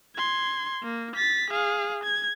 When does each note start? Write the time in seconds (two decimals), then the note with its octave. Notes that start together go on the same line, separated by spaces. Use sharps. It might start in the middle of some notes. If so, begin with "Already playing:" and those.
0.16 C6 G#6
0.83 A#3
1.16 A6 B6
1.50 G#4 F5
2.04 G#6